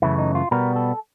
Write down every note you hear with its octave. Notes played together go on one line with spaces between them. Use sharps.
F#2 C#3 E3 A3 E4
D#4
F4
B2 G3 B3 A#4
A4